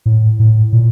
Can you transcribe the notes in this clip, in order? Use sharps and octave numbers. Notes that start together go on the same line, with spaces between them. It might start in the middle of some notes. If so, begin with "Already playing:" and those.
A2
A2
A#2